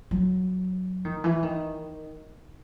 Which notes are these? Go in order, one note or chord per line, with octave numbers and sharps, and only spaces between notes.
F#3
D#3
E3
D#3